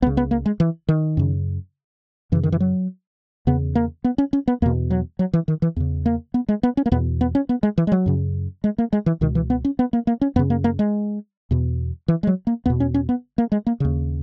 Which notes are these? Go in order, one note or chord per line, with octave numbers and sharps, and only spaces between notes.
C#2 C#3 B3
B3
A#3
G#3
E3
D#3
F#2 C#3
F#2 C#3 E3
D#3
E3
F#3
E2 C#3 B3
A#3
B3
C#4
C#4
B3
E2 B2 A#3
F#3
F#3
E3
D#3
E3
E2 C#3
A#3
B3
G#3
B3
C#4
A#3
E2 B2 B3
B3
C#4
B3
G#3
E3
G#3
F#3
F#2 C#3
G#3
A#3
G#3
E3
C#2 B2 D#3
E3
B3
C#4
B3
A#3
A#3
C#4
F#2 C#3 B3
A#3
A#3
G#3
E2 B2
E3
G#3
F#3
A#3
E2 B2 B3
C#4
C#4
B3
A#3
G#3
A#3
D#2 C#3